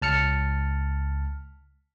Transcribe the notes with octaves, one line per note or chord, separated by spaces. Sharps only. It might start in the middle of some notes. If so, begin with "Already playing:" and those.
C#2 A5 F6 C#7